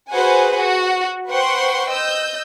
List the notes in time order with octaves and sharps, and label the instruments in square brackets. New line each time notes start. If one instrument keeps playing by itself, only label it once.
[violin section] F#4 G#4 B4 C5 F#5 G#5
F#4
B4 C5 F#5 G5 C6 C#6
D#5 E6 G6